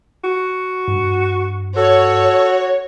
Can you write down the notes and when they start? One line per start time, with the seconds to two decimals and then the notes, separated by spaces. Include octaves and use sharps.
0.24 F#4
0.88 G2
1.76 F#4 A4 C#5